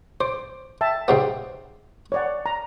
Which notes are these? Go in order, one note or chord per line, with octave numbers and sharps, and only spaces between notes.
C5 D6
E5 G5 A5
G#2 C3 B3 G5 C6 D6
C#5 D5 F#5
A#5